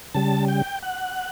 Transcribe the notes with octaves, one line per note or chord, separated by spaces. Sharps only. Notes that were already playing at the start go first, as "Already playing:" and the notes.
C#3 G3 A5
G5
F#5